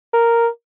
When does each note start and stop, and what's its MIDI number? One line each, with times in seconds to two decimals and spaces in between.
0.13 0.48 70